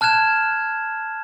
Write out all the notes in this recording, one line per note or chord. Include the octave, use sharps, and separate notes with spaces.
A5 F6 F#6 G#6 E7